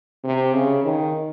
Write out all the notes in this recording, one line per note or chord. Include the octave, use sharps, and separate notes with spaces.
C3
C#3
D#3